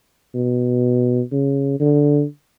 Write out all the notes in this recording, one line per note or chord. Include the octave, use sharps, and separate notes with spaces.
B2
C#3
D3